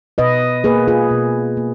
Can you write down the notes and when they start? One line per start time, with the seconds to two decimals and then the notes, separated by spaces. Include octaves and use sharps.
0.18 B2 B4 D#5
0.64 A#3 G#4 B4
0.88 F4 G#4
1.11 B2
1.57 A#3